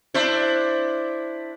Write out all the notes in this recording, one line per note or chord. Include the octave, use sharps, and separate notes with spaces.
D4 E4 C5